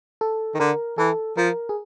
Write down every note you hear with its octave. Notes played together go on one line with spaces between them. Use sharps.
A4
D#3
D3 A#4
E3 A4
F3 A#4
G#4